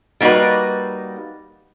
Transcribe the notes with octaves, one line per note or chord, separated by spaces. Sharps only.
G3 A#3 D#4 F#4 B4